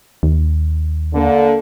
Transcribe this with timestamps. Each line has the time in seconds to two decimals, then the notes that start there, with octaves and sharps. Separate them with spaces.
0.23 D#2
1.14 D3 A#3